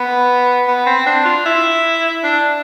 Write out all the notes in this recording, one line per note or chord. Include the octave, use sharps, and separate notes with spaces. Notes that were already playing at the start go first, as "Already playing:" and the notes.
Already playing: B3
B3
C4
D4
F4
E4
D4